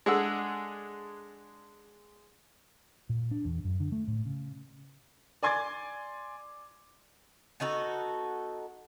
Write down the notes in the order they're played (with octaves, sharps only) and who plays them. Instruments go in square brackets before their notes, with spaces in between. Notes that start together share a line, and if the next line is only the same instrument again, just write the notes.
[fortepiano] G#3 D4 G#4 A4 F#5 E6
[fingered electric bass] A#2
D4
E2
F#2
D3
A3
A2
C#3
[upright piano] D5 G#5 C6 D6 G#6 A6
[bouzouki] B3 D#4 F#4 A4